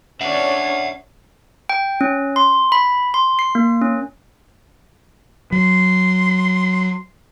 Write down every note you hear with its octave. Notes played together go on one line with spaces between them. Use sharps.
C#4 D4 C#5 E5 F#5
G5
C#4
C6
B5
C6
C7
A#3
C#4
F#3 C6